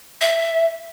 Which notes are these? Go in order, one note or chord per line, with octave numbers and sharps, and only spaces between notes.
E5